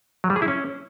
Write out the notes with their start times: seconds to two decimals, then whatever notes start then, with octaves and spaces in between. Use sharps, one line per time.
0.24 F#3
0.30 G3
0.36 G#4
0.42 E4
0.48 C#4